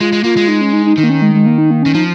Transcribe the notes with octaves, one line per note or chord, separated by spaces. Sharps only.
G#3 F4
G#3
A#3 F4
G#3
D#4
C#4
D#4
D#4
D#3 D#4
A#3
C#4
G#3
G#3
A#3
D#4
A#3
D#3 C#4
F3 D#4